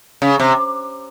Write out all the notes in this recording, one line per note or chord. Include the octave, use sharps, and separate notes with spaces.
C#3
C3